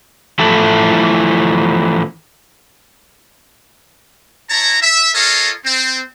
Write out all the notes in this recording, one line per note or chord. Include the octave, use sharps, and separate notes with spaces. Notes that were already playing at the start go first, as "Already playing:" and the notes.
E3 F3 A3 E4 A4
E4 C#5 A5 A#5
E5
F4 A4 A#4 C#5 D#5 F5
C4